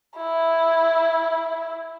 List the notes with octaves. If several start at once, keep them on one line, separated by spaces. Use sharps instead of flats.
E4